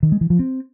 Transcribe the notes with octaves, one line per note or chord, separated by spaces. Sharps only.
D#3
G#3
E3
F3
C4